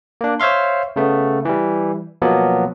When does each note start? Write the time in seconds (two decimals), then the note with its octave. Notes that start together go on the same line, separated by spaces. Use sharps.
0.21 A#3 D4
0.40 C5 C#5 E5 F5 C6
0.96 C#3 A3 B3
1.45 E3 G3
2.22 B2 F3 F#3 A#3 B3